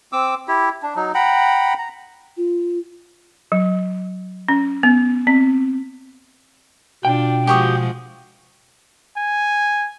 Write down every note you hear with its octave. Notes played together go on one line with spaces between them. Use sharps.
C4 D6 E6
E4 G4
D4
F#3 D#4
F#5 G5 A#5 B5
A#5
F4
F#3
C#4
B3
C4
B2 D4 F4 G5
F3 G#3 F#4 G4 C#6 D#6
G#5